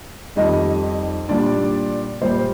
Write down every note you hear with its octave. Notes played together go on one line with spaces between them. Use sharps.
F2 D#3 G3 D#4 D#5
A#2 G3 D4 D5
A#2 G3 C5